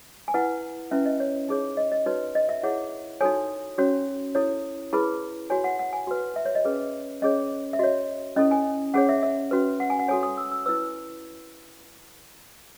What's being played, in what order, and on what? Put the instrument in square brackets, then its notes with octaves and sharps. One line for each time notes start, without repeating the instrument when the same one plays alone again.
[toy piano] G#5
E4 B4 F#5
C#4 E4 B4 E5
D#5
C#5
D#4 G#4 C#5
D#5
D#5
D#4 F#4 B4 C#5
D#5
E5
E4 G#4 C#5 F#5
D#4 F#4 A4 C#5 G#5
C#4 F#4 C#5
E4 A4 C#5
E4 G#4 B4 B5
F#4 C#5 G#5
F#5
F#5
G#5
F#4 B4
E5
C#5
D#5
C#4 G#4 B4
C#4 G#4 C#5 D#5
E5
F#4 C#5 D#5
C#4 E4 A4 D#5
G#5
C#4 G#4 C#5 F#5
E5
E5
C#4 F#4 B4
F#5
G#5
F#5
F#4 A4 C#5 G#5
D#6
E6
E6
E4 B4 E6